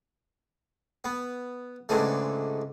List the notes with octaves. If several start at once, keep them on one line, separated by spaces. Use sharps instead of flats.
B3
C#2 G#2 D3 E3 A3